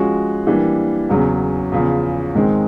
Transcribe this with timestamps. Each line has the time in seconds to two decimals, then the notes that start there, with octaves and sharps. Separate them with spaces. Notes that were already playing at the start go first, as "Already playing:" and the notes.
Already playing: F3 G#3 C#4 F#4
0.47 E3 G3 A#3 D4
1.09 E2 C#3 F#3
1.72 E2 C#3 F3
2.34 G#2 D#3 G#3 C4